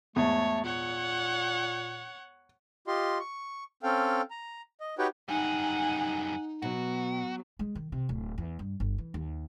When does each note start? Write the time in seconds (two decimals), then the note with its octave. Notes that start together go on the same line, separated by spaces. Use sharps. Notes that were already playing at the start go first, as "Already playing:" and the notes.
0.16 E2 G#2 A3 C#5
0.64 A#2 C#5 F#5
2.87 F4 G4 D#5 C6
3.20 C#6
3.83 C4 C#4 A4 F5 G5
4.31 A#5
4.81 D#5
4.99 D#4 F#4 G4 B4 C#5 G5
5.29 F#2 G3 D#4 F#5 G#5
6.62 B2 F#3 F#4
7.59 G#3
7.75 D#3
7.92 C3
8.09 D1
8.38 E2
8.59 G2
8.80 G1
8.98 E3
9.14 D#2